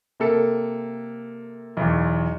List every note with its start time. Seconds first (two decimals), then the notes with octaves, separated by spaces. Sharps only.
0.20 C3 A#3 A4 C#7
1.77 B1 E2